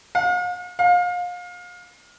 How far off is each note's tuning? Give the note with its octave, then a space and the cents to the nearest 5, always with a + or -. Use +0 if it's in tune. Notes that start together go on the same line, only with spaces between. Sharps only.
F5 +45
F5 +30